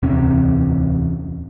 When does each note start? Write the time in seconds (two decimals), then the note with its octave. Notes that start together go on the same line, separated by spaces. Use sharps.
0.03 D1 E2 C3 C#4